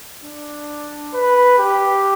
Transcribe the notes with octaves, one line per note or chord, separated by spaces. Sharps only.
D4
B4
G4